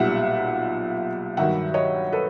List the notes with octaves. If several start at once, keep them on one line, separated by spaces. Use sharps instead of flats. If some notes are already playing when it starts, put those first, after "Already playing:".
Already playing: B1 A#2 G3 E5 F#5
G2 D#3 F#3 E5 F#5
C#5 D#5
A4 B4